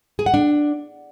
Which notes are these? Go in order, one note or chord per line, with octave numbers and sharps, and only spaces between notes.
G#4
F#5
D4